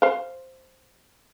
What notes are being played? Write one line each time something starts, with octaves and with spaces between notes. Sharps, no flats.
C5 F5